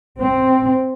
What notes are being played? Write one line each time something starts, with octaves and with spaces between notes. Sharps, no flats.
C4